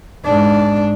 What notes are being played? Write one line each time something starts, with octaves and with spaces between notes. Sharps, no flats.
G#2 D4